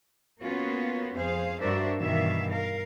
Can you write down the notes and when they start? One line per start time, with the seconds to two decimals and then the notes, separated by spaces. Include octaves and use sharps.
0.41 A#3 B3 C#4 F4 F#4
1.15 F2 G#4 C5 F5
1.60 G2 D4 F#4 A#4 C5 E5
1.98 G2 B2 D#3 E3 E5 F5
2.51 A#4 F5